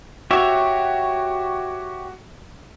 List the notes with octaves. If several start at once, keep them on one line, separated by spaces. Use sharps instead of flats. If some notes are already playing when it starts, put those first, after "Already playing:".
F#4 G4 C#5 E5